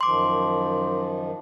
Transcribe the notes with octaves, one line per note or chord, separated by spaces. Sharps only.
F#2 D#3 F3 C6 D6